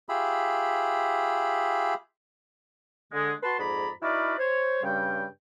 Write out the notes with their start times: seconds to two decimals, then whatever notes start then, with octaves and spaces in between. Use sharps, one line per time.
0.09 F4 G4 G#4 E5 B5
3.13 D3 G#3
3.43 F#4 B4 A5 C6
3.59 F2 G#2 G#4 D5 A#5 B5
4.02 D#4 E4 F#4 B4 D5 F5
4.38 C5 C#5
4.83 G2 C#3 G3 G5